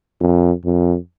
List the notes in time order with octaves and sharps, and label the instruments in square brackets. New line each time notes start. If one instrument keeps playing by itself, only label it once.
[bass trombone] F2
F2